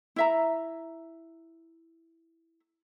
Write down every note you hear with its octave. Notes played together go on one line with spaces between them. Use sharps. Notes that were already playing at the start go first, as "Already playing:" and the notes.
E4 E5 A#5